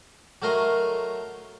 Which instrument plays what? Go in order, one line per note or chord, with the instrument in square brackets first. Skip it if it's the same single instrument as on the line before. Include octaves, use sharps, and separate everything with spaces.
[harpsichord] F#3 A3 A#4 D#5 C6